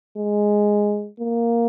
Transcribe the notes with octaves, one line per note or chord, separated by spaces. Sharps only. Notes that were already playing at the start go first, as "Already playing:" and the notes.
G#3
A#3